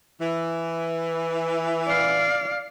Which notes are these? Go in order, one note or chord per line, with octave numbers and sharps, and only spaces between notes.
E3
D5 F5